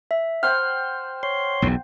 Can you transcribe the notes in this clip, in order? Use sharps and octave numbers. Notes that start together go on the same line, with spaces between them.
E5
C5 F#5 G5 F6
C#5 C6
B1 E2